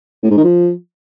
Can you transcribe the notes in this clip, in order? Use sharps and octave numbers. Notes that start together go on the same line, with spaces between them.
A2
G#2
D#3
F3